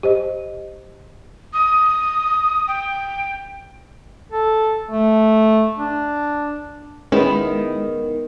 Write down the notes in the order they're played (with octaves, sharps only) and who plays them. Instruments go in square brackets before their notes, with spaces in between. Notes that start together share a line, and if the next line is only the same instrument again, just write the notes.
[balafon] G4 C5 D#5
[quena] D#6
G5
[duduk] A4
A3
D4
[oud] D#3 B3 E4 [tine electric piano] G#3 [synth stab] C#4